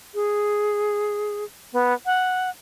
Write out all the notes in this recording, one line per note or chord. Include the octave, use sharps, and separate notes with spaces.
G#4
B3
F#5